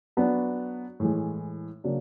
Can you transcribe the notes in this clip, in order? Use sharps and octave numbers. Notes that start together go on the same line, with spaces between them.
F#3 B3 D4 F#4
A2 E3 G#3
C#3 F#3 A#3 D4